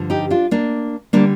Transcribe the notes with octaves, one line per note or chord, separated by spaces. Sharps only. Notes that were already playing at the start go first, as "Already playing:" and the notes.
Already playing: G2 D3 F3
D#4 G4
D4 F4
A#3 D4
D3 G3 A#3 D4